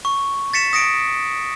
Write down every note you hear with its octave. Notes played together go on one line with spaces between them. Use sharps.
C#6
A6 B6 C#7 E7
D#6 A#6 C#7 D7